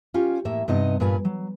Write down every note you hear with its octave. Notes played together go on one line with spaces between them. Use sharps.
C#4 F4 G4
A2 A#3 E5
G2 C3 B3 D#4 D#5
G2 A#2 A#4 B4 G#5
F#3